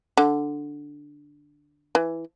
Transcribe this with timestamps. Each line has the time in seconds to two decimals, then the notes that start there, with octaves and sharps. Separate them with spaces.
0.17 D3
1.95 E3